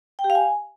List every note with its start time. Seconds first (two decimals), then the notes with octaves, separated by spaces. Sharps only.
0.19 G5
0.24 G4
0.30 F5
0.35 G#5